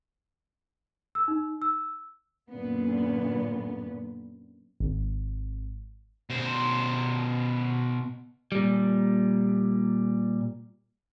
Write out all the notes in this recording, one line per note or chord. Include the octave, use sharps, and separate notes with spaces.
E6
D#4
E6
F#2 A#2 D3 B3
G#1
B2 C5
A#2 G3